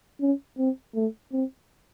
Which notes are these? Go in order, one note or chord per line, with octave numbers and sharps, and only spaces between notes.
C#4
C4
A3
C4